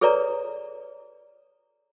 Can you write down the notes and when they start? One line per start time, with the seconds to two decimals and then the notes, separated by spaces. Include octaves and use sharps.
0.01 G#4 A4 B4 C#5 D5 A#5